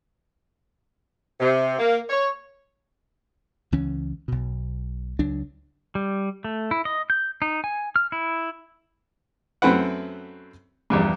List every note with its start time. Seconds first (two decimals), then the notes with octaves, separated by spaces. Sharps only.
1.40 C3
1.79 A#3
2.09 C#5
3.72 C#2 E3 C#4
4.28 B1 B2
5.19 C#2 F#3 D4
5.95 G3
6.45 A3
6.71 E4
6.85 D#5
7.10 G6
7.42 D#4
7.64 G#5
7.96 F6
8.12 E4
9.62 F#2 A3 C4 E4 B4 F#5
10.90 A#1 E2 G2